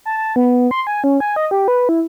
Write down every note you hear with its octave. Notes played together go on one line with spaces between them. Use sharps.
A5
A5
B3
C6
G#5
C#4
G#5
D#5
G4
B4
E4